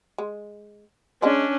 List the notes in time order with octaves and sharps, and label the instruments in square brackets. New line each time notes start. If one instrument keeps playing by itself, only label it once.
[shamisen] G#3
[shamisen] G#3 D5 D#5 [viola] C#4 D4